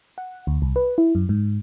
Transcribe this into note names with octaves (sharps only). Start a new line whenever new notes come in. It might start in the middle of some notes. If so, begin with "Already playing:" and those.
F#5
D2
C2
B4
E4
F#2
G#2